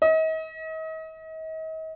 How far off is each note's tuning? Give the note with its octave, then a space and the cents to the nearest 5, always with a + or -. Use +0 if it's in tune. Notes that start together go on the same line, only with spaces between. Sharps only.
D#5 +40